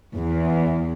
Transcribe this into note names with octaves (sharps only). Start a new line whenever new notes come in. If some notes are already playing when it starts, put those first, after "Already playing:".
E2